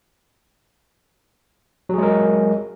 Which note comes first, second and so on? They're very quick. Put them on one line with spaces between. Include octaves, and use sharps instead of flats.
F#3 G#4 G#3 A#4